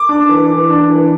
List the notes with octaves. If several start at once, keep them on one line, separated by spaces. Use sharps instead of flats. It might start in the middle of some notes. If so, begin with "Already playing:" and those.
Already playing: D6
D4
E3
E3
D4
E3